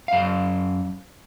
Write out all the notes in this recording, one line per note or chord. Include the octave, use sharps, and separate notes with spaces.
F#2 F5